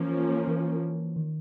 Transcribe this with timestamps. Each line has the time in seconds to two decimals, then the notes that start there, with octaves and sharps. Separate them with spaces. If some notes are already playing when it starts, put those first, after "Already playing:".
Already playing: E3 F3 A#3 C#4
0.47 E3
1.16 D#3